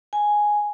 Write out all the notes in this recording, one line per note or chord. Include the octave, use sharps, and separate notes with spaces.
G#5